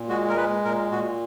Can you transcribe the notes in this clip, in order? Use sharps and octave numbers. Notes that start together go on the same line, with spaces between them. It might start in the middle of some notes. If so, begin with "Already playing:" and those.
Already playing: A#2
G#3 F#4
A#4
G#3 B4
A#2 A#4
A#2 F#4